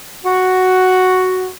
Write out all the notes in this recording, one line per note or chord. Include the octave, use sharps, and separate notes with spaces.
F#4